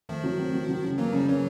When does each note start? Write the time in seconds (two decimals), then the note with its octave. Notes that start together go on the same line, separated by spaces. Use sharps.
0.09 D#3 F3 A3
0.24 F#3
0.38 C4
0.53 F#3
0.69 F#3
0.84 C#3
0.98 E3 F#3 A#3
1.13 C#3 F3 G3
1.28 E3 F#3 C#4